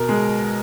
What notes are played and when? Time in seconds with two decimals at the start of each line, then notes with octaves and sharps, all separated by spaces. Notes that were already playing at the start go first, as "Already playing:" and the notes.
Already playing: B2 A#4
0.09 G#3